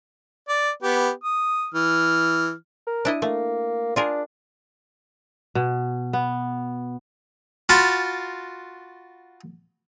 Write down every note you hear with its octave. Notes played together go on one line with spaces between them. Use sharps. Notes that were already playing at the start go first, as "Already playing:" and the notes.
D5
B3 G4
D#6
E3 F6
A#4
D4 E4 D#5
A3 A#3
D4 F4 G#4 A#4
B2
B3
F4 F#4 F5 A5 B5 C6